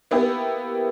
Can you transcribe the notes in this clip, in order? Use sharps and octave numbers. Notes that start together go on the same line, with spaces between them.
A#3 B3 E4 G4